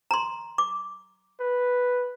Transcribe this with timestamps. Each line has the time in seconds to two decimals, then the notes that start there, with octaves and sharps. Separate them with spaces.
0.11 A#5 C6
0.58 D6
1.40 B4